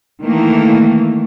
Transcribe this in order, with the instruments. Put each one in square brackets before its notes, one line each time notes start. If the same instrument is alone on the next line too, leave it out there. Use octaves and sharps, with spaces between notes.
[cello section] D#3 E3 A3 A#3